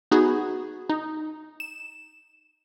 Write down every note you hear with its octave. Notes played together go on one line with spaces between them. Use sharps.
B3 D#4 F#4 G#4
D#4
E7